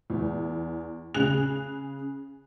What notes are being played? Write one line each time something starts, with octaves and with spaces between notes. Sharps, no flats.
E2
C#3 G#4 F#6 F7